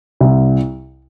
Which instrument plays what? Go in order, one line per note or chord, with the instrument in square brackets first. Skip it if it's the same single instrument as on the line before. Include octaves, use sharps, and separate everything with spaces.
[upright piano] C2